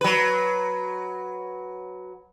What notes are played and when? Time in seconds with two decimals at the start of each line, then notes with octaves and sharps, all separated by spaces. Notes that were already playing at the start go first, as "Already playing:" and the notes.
0.01 F#3 B4